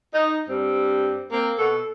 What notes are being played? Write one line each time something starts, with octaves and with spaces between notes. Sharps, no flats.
D#4
G2 G3 C4
A#3 C4
B2 B3 A4